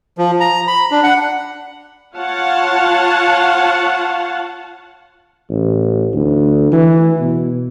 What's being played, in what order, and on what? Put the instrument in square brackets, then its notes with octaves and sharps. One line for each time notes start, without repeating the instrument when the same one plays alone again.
[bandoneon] F3
A#5
B5
D4
F#5
[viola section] F4 C#5 F5 F#5 A5
[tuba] A1
D2
E3
B2